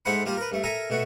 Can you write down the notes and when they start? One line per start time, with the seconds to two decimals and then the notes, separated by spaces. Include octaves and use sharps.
0.05 G#2 A3 A4 C5 F#5 B5
0.26 G3 A#3 F4 G4
0.37 A#4 B4
0.52 G2 A3
0.64 A4 A#4 E5 G#5 A#5
0.90 B2 A3 F#4